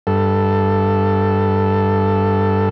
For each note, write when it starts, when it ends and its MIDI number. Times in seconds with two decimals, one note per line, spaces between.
0.07 2.69 43
0.07 2.69 69